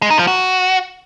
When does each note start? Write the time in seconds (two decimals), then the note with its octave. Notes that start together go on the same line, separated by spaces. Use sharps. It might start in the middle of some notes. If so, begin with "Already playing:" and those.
0.02 G#3
0.10 D#4
0.19 F3
0.27 F#4